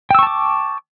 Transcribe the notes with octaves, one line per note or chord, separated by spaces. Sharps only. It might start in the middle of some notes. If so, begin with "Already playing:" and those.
G5 A5 C#6 D6 E6